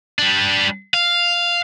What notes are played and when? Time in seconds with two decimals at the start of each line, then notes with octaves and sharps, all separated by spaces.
0.19 G3 D4
0.94 F5